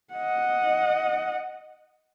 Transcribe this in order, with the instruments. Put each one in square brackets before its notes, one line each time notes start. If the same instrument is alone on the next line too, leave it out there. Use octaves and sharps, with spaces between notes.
[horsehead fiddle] D#5 F#5